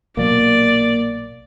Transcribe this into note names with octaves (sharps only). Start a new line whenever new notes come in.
A#1 B2 F#3 A#3 D5